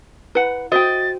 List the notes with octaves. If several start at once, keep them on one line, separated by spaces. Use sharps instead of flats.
E4 B4 F#5
F#4 C5 D#5 G5 A6